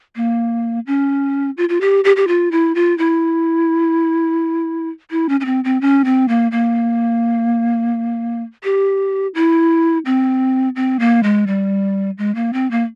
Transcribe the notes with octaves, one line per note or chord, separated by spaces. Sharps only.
A#3
C#4
F4
F4
G4
G4
G4
F4
E4
F4
E4
E4
C#4
C#4
C4
C4
C#4
C4
A#3
A#3
G4
E4
C4
C4
A#3
G#3
G3
G#3
A#3
C4
A#3